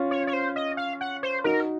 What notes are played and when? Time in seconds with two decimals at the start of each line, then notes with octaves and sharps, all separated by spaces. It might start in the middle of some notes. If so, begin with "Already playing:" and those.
Already playing: C#4 F4
0.11 C#5
0.27 C#5
0.33 C5
0.56 D#5
0.77 F5
1.01 F#5
1.23 C5
1.44 D#4 F#4 A#4